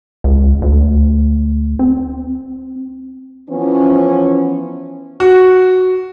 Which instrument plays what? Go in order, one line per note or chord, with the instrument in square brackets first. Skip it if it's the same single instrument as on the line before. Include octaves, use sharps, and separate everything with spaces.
[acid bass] C#2
D2
C4
[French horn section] E3 F3 B3 C#4
[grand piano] F#4